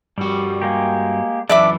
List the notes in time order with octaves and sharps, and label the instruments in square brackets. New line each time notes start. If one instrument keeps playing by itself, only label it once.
[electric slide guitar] G2 F#4 [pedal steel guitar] G3
[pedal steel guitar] G#3 A#3 G4
[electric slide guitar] F#2 E3 E4 [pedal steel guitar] D4 [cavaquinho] D5 E5 D6